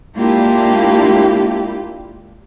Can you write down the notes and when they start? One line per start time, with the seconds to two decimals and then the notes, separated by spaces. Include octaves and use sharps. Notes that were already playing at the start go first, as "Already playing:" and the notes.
0.17 G#3 A#3 D4 E4 F4 G4